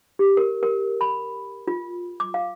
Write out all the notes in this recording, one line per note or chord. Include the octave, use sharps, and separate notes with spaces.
G4
A#4
A#4
B5
F4
D6
F5